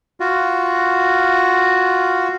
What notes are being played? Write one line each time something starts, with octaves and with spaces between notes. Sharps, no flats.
F4 F#4